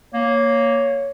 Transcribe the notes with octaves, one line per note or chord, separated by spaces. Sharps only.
A#3 C#5